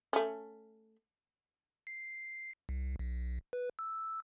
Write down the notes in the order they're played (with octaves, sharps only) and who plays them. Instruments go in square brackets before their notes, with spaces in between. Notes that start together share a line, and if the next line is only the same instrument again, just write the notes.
[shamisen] A3 C#4
[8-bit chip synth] C7
C2
B1
B4
E6